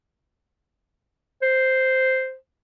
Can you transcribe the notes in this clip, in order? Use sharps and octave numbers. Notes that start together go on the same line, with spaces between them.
C5